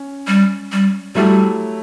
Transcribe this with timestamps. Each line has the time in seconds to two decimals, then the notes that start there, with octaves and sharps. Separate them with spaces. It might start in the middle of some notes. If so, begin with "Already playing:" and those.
Already playing: C#4
0.27 G3
0.72 G3
1.15 F#3 G3 A3 E4 G4